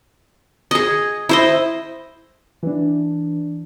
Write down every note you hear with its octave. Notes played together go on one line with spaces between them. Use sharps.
G#4 D#5
E4 C5 D#5
E3 D4